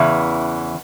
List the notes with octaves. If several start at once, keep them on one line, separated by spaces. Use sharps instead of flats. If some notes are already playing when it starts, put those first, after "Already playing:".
Already playing: E2 C#3 E3